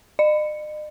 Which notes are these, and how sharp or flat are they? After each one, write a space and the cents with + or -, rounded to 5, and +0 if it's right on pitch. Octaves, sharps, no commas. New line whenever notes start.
D#5 -45